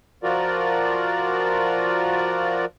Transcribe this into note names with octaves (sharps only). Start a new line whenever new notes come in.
F3 F4 F#4 A#4 D5